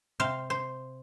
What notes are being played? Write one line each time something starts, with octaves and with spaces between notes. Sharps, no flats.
C3 C5 F5
C5